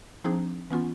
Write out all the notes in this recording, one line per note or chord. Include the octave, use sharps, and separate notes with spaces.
F3 C4 D4 D#4 G#4
E3 B3 C#4 F4